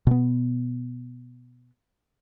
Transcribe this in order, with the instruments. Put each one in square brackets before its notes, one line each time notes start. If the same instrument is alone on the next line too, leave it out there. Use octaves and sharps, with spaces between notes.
[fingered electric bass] B2 B3